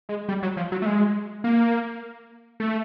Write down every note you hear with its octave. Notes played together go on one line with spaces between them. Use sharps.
G#3
G3
F#3
F3
F#3
A3
G#3
A#3
A3